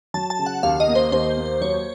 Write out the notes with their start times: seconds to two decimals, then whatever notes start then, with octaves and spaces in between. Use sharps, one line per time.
0.14 F#3 A5
0.30 A5
0.39 C#3
0.46 F#5
0.63 D#2 F5
0.80 D#5
0.88 A#3
0.95 C5
1.12 D#2 C5
1.37 A#3
1.61 F#3 C#5